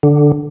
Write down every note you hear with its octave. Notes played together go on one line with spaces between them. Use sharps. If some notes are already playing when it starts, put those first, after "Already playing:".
D3